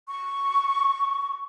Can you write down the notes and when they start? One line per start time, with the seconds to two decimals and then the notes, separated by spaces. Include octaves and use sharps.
0.07 C#6